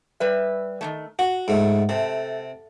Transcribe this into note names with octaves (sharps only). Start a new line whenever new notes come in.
G3 B4 E5
D#3 E3 A3
F#4 F#5
G#2 A3
C3 A3